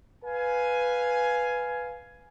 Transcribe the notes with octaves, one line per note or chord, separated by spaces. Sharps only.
B4 F5 G#5